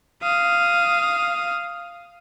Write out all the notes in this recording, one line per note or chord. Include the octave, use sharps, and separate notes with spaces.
F5 D#6